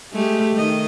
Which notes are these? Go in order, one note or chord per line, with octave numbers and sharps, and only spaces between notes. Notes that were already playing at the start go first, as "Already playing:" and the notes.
G#3 A3 G4
D#3 D#5